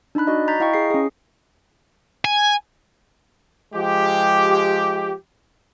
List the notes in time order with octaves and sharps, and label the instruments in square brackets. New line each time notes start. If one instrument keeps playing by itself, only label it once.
[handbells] D4 D#4 A5 B5 F#6
F#4 D5 D#5
A#5 G6 A6 B6
E4 D#5 F5 G5 A#5 C#6
G#4 C7
C#4 G#4
[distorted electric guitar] G#5
[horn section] F3 G#3 G4